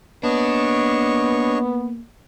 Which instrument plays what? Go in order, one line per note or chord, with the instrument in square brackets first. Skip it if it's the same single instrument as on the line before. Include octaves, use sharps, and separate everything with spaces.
[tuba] A#3 [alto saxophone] B3 [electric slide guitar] D4 [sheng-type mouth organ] C#5 D#5 C#6